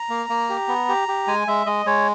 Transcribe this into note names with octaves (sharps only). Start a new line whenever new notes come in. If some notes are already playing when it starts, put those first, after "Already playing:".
Already playing: A#5
A#3
A#3
G4
B3
G4
G4
G#3 G#5
G#3 E5
G#3 D#5
G#3 C#5